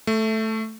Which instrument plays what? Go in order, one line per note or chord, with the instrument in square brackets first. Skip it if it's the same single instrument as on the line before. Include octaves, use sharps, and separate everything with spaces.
[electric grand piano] A3